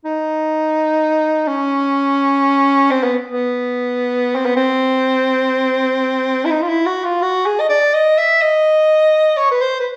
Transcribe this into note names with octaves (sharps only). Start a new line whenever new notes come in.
D#4
C#4
C4
B3
B3
C4
B3
C4
E4
D#4
F4
E4
F#4
F4
F#4
G#4
D#5
D5
D#5
E5
D#5
C#5
B4
C5
B4